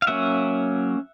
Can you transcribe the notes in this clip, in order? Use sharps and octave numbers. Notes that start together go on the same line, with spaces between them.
F5
F#3 A#3 C#4 E5 F#5